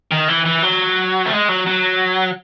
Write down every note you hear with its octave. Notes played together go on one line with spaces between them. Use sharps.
D#3
E3
E3
F#3
A3
G#3
F#3
F#3